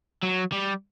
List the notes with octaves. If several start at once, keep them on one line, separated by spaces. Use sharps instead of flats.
F#3
G3